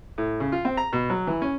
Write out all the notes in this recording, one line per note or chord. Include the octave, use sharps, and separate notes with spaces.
A2
C#3
F4
C4
A#5
B2
F#3
E3
C#4